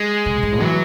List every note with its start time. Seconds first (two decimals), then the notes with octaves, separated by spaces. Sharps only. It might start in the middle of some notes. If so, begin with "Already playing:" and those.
Already playing: G#3
0.26 C#3
0.35 B2
0.43 G#2
0.52 A2
0.61 E3 F#3